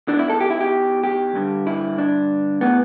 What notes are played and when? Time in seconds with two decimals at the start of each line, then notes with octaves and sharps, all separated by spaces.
0.08 E2 E3 D4
0.19 E4
0.30 A4
0.40 G4
0.50 E4
0.61 G4
1.03 G4
1.35 G2 D3
1.67 E4
1.98 D4
2.61 A2 E3 B3